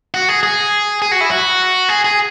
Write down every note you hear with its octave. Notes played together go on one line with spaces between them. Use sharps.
F#4
G#4
G#4
G#4
F#4
E4
F#4
G#4
G#4